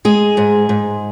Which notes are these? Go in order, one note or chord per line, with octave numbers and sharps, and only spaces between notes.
G#3 G#4
G#2
G#2